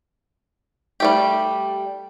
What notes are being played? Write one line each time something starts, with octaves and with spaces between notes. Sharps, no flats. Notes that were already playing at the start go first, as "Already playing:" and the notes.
G3 A3 G4